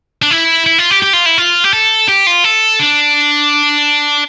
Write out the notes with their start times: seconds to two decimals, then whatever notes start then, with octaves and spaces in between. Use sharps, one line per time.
0.22 D4
0.31 E4
0.66 E4
0.78 F4
0.91 G4
1.02 G4
1.13 F4
1.26 E4
1.38 F4
1.64 G4
1.73 A4
2.08 G4
2.27 F4
2.44 A4
2.80 D4